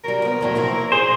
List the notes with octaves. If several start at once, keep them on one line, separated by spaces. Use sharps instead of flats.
F#3 G3 A#4
F3 B3
E2 A2 F#3
F3 A#3 E4
A#2 G#4 C5